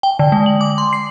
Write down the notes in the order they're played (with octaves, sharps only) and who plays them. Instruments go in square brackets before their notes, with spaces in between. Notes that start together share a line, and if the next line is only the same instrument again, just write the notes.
[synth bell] G5
D3
G#3
F#7
D6
C6
C7